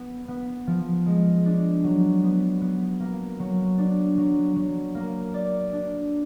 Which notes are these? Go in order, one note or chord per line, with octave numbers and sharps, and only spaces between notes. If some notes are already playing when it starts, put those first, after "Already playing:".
Already playing: B3
B3
F3
G#3
D4
F#3
B3
B3
A#3
F#3
D4
F#3
F#3
A#3
D5
D4